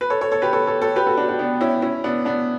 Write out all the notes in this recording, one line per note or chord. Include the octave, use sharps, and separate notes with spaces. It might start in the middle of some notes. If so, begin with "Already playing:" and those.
B4
A4 C#5
A4 C#5
A4 C#5
G4 B4
A4 C#5
A4 C#5
A4 C#5
G4 B4
F#4 A4
D4 F#4
D4 F#4
B3 D4
C#4 E4
C#4 E4
B3 D4
B3 D4